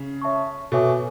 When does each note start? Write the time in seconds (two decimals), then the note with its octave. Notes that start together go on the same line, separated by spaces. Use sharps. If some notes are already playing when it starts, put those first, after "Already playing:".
Already playing: C#3
0.22 C#5 E5 A5 C#6
0.72 B2 A4 C#5 E5 G#5 D6